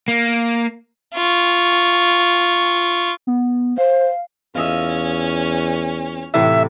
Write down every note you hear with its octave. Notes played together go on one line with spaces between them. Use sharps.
A#3
F4 C#6
B3
C5 F5
E2 C#4 F4 D#5 E5
A2 C3 E3 E5